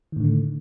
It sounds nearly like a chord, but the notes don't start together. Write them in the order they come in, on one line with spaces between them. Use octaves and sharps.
D#3 A2 D3 A3